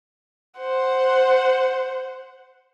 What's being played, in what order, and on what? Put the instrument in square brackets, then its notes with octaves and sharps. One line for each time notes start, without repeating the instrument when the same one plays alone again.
[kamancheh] C5 F#5